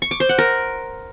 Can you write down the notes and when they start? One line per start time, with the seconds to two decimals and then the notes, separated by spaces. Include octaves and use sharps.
0.02 C#6
0.11 D6
0.20 C5
0.29 F#5
0.38 A#4